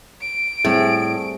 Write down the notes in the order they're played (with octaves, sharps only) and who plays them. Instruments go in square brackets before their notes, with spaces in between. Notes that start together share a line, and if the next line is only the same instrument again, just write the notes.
[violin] D7
[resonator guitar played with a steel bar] A2 [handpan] G3 C4 G#4